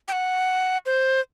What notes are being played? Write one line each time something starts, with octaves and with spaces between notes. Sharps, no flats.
G5
F#5
C5